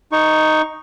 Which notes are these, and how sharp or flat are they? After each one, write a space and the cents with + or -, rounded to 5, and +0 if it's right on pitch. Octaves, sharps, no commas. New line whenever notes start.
D#4 +0 C#6 +0